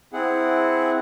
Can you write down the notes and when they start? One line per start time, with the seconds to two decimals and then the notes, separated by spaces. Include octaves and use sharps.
0.13 C4 E4 G#4 F#5